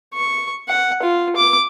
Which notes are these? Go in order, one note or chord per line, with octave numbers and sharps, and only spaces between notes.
C#6
F#5
F4
D6